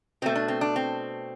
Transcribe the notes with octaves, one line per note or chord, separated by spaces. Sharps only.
B2 A3 C4
D4
C4
D4
C4